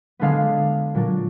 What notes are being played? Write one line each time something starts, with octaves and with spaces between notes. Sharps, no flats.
D3 G#3 B3 D4 F5
A#2 F#3 D4